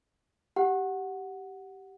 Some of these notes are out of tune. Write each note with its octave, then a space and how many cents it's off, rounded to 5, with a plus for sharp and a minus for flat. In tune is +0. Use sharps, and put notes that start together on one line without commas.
G4 -15 F#5 +0